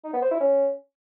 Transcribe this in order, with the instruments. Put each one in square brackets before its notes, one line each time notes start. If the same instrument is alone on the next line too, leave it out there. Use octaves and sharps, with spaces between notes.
[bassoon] D#4
B3
C5
E4
C#4